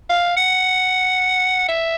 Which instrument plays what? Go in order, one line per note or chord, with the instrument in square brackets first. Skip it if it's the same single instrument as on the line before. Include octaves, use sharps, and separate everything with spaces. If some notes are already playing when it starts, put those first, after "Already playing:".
[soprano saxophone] F5
F#5
E5